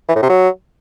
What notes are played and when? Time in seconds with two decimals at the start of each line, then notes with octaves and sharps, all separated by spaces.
0.08 E3
0.15 A2
0.22 C3
0.29 F#3